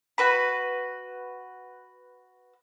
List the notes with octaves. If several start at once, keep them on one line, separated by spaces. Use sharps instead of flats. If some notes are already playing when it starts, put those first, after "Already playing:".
F#4 B4 B5